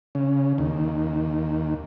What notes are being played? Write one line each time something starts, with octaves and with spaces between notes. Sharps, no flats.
C#3
D#2